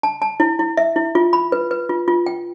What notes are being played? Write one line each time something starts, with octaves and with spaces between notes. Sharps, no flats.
A5
A5
E4
E4
E5
E4
F4
B5
B4
B4
F4
F4
G5